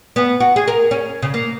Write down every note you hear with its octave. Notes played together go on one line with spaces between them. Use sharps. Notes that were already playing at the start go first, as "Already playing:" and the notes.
B3
F#4
G#4
A#4
C#4
C#3
A#3